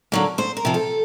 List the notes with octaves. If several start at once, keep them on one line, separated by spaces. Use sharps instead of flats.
D3 F#3 A#3
D2 C5
A#4
C3 F3
A4